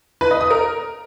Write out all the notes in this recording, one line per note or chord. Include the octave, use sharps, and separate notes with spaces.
B4
D#5
D#6
A#4